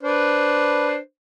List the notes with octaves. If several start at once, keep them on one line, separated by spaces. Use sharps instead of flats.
D4 B4 C5